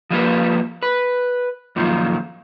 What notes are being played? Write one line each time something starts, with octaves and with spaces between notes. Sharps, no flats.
F3 G3 A#3 B4
B4
F#2 A#2 D#3 F3